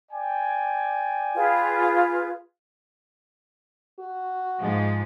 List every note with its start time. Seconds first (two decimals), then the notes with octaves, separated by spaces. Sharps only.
0.11 D5 G5 G#5
1.35 F4 G#4 B4
3.99 F#4
4.62 G#2 F3 G#3